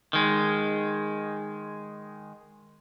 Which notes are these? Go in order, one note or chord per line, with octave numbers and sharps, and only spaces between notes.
D#3 G#3